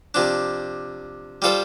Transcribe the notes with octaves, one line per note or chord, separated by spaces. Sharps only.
C3 F3 D4
G3 F4 A4 C5